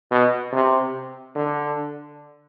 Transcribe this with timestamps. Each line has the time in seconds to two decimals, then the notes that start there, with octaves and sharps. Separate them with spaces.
0.11 B2
0.52 C3
1.35 D3